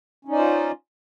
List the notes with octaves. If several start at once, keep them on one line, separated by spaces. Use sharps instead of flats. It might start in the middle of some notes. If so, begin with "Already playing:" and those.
C#4 D#4 F4 C5 D5